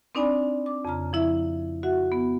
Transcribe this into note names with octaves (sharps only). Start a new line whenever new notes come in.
C4 D4 D#4 D5 G#5 B5
D6
F2 C#3 A#5 F6
F3 E4 E5
F#4 E5 F#5
B3